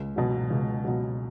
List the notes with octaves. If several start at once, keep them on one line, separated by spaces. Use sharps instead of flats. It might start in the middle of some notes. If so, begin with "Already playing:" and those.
Already playing: C#2
B2 F#3
C#2
B2 F#3